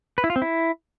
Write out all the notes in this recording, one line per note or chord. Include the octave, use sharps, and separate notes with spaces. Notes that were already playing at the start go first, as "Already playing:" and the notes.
B4
E4
F4
C4
E4